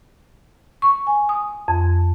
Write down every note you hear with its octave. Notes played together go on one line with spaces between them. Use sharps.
C#6
G#5
D#6
F2